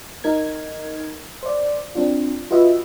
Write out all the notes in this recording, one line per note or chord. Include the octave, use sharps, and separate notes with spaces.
D#4 A#4 G#6
C5 D5
C4 D4 F4
F4 F#4 B4 D#5 E5